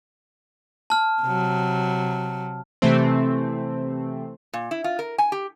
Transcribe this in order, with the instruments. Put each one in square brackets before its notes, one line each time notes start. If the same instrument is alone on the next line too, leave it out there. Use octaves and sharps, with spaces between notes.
[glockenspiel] A5 F6
[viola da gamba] C3 F#3
[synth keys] C3 E3 A3 C4
[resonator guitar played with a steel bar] A#2
E4
F4
A#4
G#5
G4